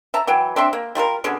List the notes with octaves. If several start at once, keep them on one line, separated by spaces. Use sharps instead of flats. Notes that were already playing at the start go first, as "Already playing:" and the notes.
E5 A5 A#5
E3 F#3 G5
C4 D4 E5 C6
A#3
G3 F4 A4 A#4
B2 D3 C#4 G#4